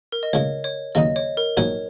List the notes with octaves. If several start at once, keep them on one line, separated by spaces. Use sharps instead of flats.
A#4
D#5
C#2 C#3 G#3 C#5
C#5
D#2 C#3 F#3 D#4 D#5
C#5
A#4
A#1 G#2 F#3 D#4 F#4 C#5